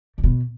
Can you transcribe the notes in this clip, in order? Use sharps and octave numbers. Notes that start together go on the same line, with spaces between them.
C#3
B2